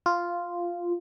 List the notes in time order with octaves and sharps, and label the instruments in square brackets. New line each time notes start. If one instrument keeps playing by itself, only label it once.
[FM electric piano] F4